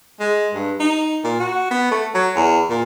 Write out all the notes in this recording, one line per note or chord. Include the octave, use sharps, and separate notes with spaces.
G#3
G2
D#4
A#2
F#4
B3
A3
F#3
E2
A#2